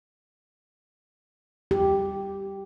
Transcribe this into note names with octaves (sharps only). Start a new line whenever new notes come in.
G4